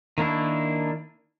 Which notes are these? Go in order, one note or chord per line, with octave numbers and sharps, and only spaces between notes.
D#3 A#3 D4 E4